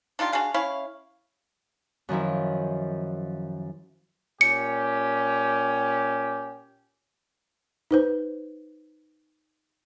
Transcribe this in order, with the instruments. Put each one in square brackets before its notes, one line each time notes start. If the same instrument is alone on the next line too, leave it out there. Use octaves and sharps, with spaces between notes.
[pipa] D4 D#4 F4 G4
D4 F#4 G#4 F5
C#4 E4 C#5 F5
[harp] F#2 D#3 F3 E4
[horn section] A#2 C#4 G4 [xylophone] C#7
[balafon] D#4 B4 C5